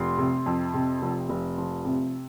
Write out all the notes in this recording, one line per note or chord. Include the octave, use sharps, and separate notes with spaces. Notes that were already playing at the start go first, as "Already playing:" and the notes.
Already playing: F1 C6
C3
F2
C3
F1
F1
F3
C3